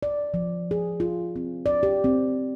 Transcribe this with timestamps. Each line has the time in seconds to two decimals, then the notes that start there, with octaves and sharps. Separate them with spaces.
0.03 D5
0.34 F3
0.71 G#4
1.00 F4
1.36 C4
1.66 D5
1.83 G4
2.04 C4